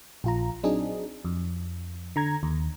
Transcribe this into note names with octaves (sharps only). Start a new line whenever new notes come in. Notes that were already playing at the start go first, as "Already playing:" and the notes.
A#1 F4 A#5
F#3 C4 D4 D#4 G#4
F2
D3 A#5 G#6
D#2